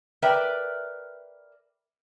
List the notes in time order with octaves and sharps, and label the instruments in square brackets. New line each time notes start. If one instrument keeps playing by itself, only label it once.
[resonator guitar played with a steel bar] A#4 B4 D5 E5 G5